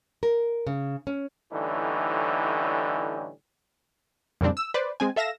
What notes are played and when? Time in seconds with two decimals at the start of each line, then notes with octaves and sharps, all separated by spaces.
0.23 A#4
0.67 C#3
1.07 C#4
1.52 A2 D3 E3 G3 C#4 D#4
4.41 F2 A#2 C#3 G3 C4 D4
4.57 E6
4.74 B4 C5 D5
5.00 G#3 C4 G#5
5.16 A4 E5 F5 A#6 E7